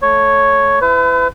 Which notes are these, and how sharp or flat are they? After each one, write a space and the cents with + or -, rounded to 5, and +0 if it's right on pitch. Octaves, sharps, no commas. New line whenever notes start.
A3 +0 C#5 +0
E4 +15 B4 +40